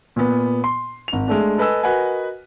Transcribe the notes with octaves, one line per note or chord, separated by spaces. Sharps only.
A#2 B3
C6
G#1 F7
G#3 A3 D4
A4 B4 D#5 G#5 E6
F#4 A#4 B4 D#5 F#5 G#5